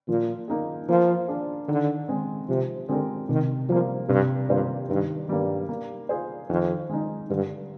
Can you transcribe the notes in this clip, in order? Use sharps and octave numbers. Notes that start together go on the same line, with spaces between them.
A#2 F3
A#3 D#4 G#4
F3 A#3
D4 G#4
D3 D#3
G#3 C4
C3 F3
D3 G#3 C4 G4 A#4
C3 D#3
F3 G3 A#3
G2 C3
G2 G3 A#3 F4 C5
G2 D#3
G2 G3 A#3
A#3
F4 G#4 C5
F2 D#3
G#3 D#4
G2 D3